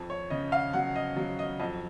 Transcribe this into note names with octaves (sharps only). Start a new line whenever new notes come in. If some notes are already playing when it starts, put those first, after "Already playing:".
Already playing: F2
C#5
C#3 D#5
F5
F#3 F#5
D#5
F#3
D#5
F2 D#5